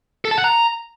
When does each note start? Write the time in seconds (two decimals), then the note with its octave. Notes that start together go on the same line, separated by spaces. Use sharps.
0.25 A4
0.31 A5
0.38 F#5
0.44 A#5